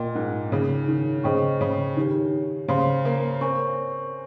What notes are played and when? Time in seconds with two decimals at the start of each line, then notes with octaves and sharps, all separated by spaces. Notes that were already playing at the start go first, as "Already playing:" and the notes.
Already playing: A#2 A#4 D#5 G5 C6
0.15 G#2
0.52 C#3 D#4 G#4 C#5
0.88 D#3
1.24 C#3 G#4 C5 D#5 G5 C#6
1.61 C#3
1.97 D#3 D#4 G4 C#5
2.68 C#3 C5 F5 C6
3.05 A#3
3.41 C4 A#4 C#5 G#5 C#6